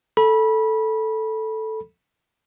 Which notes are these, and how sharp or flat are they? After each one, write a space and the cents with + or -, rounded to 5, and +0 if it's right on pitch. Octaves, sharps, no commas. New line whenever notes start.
A4 +0 B5 -25